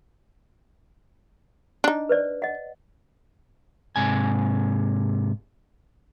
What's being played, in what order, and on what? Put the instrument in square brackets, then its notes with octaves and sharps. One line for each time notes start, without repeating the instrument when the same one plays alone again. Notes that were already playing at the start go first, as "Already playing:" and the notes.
[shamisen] D4 D#4
[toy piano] B4 C5 D5
D#5 F#5
[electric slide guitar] G#2 C3 G#5